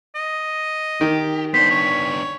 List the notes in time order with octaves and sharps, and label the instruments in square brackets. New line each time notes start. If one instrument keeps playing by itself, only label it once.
[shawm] D#5
[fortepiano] D#3 [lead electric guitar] G4
[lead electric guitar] B3 D4 [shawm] C5 [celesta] B6
[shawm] C#5